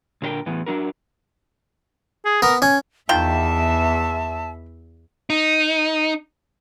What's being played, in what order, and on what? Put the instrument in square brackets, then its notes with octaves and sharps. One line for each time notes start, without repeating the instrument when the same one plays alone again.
[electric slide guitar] A#2 D3 A#4 B4 G5
E2 A2 E3 B3
F#3 D4 F#4 A#4
[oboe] G#4
[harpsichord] B3 [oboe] A#4
[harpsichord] C#4 [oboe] G#5
[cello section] E2 E5 [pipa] D#3 F4 G5 [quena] A5
[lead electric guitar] D#4